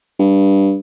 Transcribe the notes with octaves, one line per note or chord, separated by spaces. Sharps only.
G2